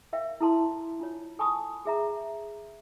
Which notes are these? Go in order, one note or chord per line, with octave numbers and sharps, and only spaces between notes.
A#4 E5 F5 G5
E4 A4 A5 C6
D4 F4 C#5
A4 G#5 A5 B5 C#6 D#6
G#4 E5 A#5